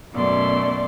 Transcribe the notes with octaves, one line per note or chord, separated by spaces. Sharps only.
F#2 B2 A3 D5 C6